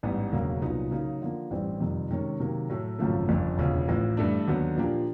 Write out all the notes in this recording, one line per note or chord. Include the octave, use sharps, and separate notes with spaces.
A1 G#2 E3 G3 B3
E1 D2 C#3 F#3 A#3
C2 A#2 F#3 B3 D#4
C#3 F#3 A#3 D#4
D3 F3 A#3
A1 G2 E3 G3 C4
F2 C3 D#3 G3
C3 D#3 G#3 C#4
C3 D#3 F#3 A#3
A2 F#3 A3
G#1 F#2 C#3 F3 A3
G1 F2 C#3
E1 D2 C#3 F3
A1 A2 F3
G2 E3 A3 D4
D#2 D3 F#3 B3
A#2 F3 A#3 D4 G4